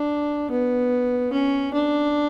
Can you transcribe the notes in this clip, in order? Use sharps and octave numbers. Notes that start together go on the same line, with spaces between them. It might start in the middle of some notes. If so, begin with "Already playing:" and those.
Already playing: D4
B3
C#4
D4